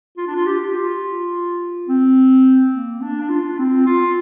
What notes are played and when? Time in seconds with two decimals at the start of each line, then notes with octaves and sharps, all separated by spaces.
0.17 F4
0.27 D4
0.35 F4
0.46 G4
0.75 F4
1.88 C4
2.73 A#3
3.01 D4
3.20 D4
3.29 F4
3.58 C4
3.86 F4